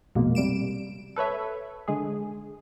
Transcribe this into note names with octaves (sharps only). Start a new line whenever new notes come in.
A#1 F2 B2 G#3 A#3
C3 G3 D7 E7
A4 B4 C#5 E5
D3 G#3 G#4